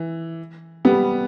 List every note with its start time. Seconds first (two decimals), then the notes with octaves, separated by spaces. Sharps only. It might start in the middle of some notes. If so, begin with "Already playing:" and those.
Already playing: E3
0.85 G3 B3